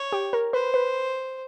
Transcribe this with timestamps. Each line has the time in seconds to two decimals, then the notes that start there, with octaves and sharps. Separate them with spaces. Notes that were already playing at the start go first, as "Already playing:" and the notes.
Already playing: C#5
0.12 G4
0.33 A#4
0.53 B4 C5
0.74 B4